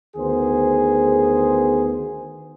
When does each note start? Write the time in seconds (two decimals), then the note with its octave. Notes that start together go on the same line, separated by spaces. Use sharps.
0.16 D2 D#3 B3 G#4 C5